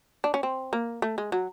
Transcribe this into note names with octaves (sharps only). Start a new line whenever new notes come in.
D4
C#4
C4
A#3
A3
G#3
F#3